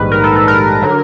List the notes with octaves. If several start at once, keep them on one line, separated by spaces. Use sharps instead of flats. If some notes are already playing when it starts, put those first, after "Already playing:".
Already playing: A#1 G#2 D#3 G3 B4
A#4
A4
A4
A#4
D3 F#3